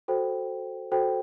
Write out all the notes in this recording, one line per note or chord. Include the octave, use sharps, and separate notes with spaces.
F#4 A4 C5 G5
F#4 A4 C5 G5